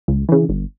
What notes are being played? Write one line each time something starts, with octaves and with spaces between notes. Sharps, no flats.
C#2
C#3 E3
G1